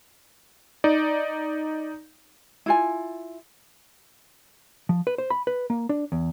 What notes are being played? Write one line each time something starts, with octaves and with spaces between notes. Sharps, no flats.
D#4 D5
E4 F4 G#5
F3
B4
C5
B5
B4
A#3
D4
E2